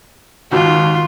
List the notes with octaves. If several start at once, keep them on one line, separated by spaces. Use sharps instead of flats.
G#1 D#2 D#3 F4 F#4